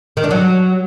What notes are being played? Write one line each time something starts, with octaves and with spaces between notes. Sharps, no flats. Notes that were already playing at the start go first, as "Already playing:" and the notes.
D#3
D4
F#3